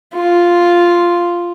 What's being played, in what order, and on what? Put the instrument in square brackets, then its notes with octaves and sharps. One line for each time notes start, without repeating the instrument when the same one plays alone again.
[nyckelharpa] F4